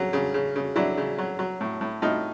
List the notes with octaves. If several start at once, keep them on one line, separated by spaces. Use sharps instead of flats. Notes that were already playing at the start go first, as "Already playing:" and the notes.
Already playing: C#3 F#3
C#3
C#3
C#3
F#3 D4 E4
C#3
F#3
F#3
A2
A2
A2 D#4 F4